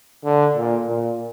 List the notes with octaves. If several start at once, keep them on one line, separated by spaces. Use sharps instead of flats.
D3
A#2
A#2